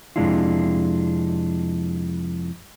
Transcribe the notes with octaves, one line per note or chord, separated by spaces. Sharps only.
F2 C3 G#3 D4 E4 F4